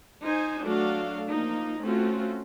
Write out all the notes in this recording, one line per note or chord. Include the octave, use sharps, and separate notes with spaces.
D#4 C5 G#5
F#3 A3 D4 F#4 A4 F5
F3 A#3 D#4
A3 C4 C#4 F4 F#4